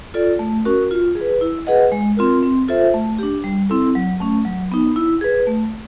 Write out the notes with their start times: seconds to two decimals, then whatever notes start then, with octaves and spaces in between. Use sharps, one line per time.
0.14 F4 A4 D5
0.39 A3
0.65 C#4 F#4 A#4
0.91 F4
1.15 G#4
1.21 B4
1.41 E4
1.67 G#4 B4 D#5 F#5
1.92 G#3
2.17 C4 F4 A#4
2.43 C4
2.68 F4 A4 C5 E5
2.94 A3
3.19 D4 G4
3.44 G3
3.70 C4 E4 A4
3.95 F#3
4.20 A3 C#4
4.45 F#3
4.72 B3 D#4
4.96 E4
5.21 G#4 B4
5.47 A3